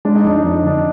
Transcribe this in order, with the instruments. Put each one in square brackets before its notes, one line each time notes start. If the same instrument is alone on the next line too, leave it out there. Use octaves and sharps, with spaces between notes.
[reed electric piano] G#3 [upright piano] D4
[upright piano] D#4
[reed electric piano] F2 [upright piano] D4
[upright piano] D#4
[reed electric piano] F2 [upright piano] D4
[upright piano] D#4
[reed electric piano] D3 [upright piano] D4